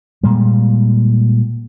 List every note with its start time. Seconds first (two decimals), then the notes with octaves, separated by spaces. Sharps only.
0.23 A#2 G3 G#3